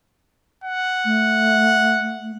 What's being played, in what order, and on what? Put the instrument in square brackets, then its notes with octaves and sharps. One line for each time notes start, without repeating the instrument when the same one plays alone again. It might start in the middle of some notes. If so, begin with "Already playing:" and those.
[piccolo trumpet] F#5
[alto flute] A3